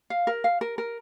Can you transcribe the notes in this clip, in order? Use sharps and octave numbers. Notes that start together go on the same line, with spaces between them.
F5
A#4
F5
A#4
A#4